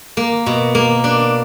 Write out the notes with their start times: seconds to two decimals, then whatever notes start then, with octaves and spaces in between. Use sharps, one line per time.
0.17 A#3
0.46 B2
0.75 A#3
1.04 D4